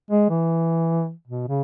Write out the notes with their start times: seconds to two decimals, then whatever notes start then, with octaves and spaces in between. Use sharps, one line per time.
0.11 G#3
0.30 E3
1.28 B2
1.48 C#3